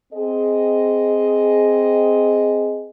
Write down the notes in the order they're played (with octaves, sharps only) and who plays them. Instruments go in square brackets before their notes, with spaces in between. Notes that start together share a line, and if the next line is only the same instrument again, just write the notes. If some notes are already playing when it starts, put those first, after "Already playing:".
[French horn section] C4 G#4 D#5